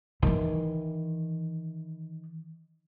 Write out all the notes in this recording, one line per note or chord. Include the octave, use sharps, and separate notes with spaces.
D#3 E3